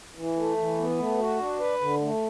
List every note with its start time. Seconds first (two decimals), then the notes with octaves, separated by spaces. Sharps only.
0.15 E3
0.36 A3
0.57 E3
0.78 B3
0.98 A3
1.19 F#4
1.39 D4
1.59 B4
1.81 D3
2.01 A3